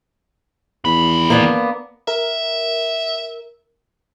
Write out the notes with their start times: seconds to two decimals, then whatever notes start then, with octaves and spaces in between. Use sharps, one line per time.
0.85 E2 D#3 B5
1.30 A#3 B3 D4
2.08 A#4 E5